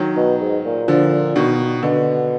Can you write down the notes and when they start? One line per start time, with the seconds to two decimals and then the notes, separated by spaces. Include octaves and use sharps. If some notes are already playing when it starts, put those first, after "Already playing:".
Already playing: D#3 F#3
0.17 B2
0.41 G#2
0.65 A#2
0.88 D3 F3
1.36 B2 D#3
1.83 B2 D3